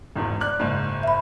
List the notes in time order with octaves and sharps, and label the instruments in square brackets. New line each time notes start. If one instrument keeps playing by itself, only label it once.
[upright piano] G#1 E2 G#2
D5 F#6
F#1 G#2
[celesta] E5 B5